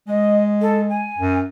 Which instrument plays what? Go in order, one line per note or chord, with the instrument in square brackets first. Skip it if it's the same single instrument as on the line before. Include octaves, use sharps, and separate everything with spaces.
[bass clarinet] G#3 [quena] D#5
[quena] A4
G#5
[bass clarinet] F#2